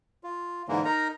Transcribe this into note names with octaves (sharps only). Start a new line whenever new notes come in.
F4
G#2 D3 E3 A#3
D#4 A#4 A#5